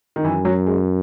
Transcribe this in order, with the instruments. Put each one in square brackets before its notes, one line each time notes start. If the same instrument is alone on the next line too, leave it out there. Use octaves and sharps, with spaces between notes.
[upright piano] D#3
[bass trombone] F#2 [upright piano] E3
[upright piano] F#3
G#3